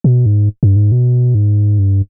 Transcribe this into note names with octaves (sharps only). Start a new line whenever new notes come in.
B2
G#2
G2
G#2
B2
G#2
G2